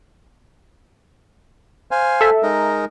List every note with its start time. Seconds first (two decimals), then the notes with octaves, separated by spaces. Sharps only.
1.91 C5 F5 G#5
2.21 A4 E5
2.43 G#3 D#4 A#4